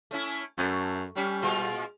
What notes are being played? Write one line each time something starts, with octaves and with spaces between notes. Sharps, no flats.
A3 C#4 E4
F#2 A3
G3 C#4
A#2 G#3 F4